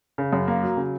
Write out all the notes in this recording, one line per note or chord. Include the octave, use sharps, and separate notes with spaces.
C#3
F#2
A#3
F#3
C#3